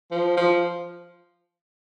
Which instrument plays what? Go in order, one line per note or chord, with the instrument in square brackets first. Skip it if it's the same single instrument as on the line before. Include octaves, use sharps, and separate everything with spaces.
[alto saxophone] F3
F3